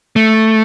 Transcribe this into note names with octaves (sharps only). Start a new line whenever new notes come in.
A3